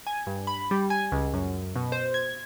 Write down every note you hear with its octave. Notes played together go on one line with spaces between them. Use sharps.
G#5
G2
B5
G3
G#5
C#2
F#2
B2
C5
G#6